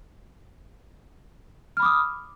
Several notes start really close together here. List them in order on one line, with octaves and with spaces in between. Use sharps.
F6 B5 D6 D#6